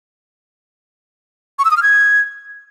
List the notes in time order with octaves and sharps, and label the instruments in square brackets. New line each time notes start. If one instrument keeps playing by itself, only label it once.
[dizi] C#6
E6
D#6
F6
G#6